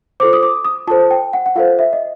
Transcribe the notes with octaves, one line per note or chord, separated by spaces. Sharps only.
F4 A4 C5 D6
D#6
D6
D#6
F4 A4 C5 A5
G5
F#5
F#5
F4 A4 C5 F5
E5
D#5